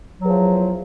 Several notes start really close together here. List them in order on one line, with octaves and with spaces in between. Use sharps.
F#3 E2 F3